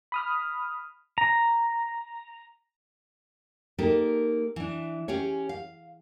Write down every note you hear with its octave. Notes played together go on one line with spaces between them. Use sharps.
B5 D#6 F6
A#5
A#3 D#4 G4 A4 A#4
E3 D4
C#4 G4 G#4 C#5
F5